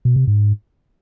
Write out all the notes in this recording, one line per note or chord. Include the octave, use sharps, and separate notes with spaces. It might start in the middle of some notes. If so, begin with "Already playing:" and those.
B2
C3
G#2